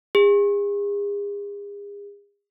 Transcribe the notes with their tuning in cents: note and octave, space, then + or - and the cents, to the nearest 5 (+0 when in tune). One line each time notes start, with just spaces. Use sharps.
G#4 -40